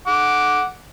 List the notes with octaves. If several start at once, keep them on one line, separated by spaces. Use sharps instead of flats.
F#5 D6